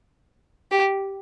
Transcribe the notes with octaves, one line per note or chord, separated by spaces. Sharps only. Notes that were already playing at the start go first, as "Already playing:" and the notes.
G4